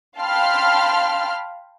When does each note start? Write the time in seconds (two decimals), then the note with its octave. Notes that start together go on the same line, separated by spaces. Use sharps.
0.18 F5 G5 A5 B5 C6 F6